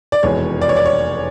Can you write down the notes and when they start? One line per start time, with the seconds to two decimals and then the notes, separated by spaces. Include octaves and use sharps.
0.12 D5
0.23 F1 E2 B2 G#3 C#5
0.61 D5
0.69 C#5
0.76 D5
0.86 C#5